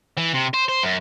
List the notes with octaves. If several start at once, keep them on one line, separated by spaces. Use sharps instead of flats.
E3
C3
C5
C5
F#2